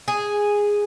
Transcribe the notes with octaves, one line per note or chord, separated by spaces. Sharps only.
G#4